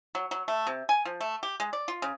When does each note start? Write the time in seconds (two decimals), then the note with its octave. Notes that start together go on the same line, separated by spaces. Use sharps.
0.15 F#3
0.31 F#3
0.48 A3
0.67 C3
0.89 G#5
1.05 F3
1.21 A3
1.43 G4
1.60 G#3
1.73 D5
1.88 F4
2.02 C#3